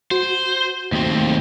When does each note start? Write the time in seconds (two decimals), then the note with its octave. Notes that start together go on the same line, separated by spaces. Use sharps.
0.11 F#4 C5
0.92 D#2 A3 C4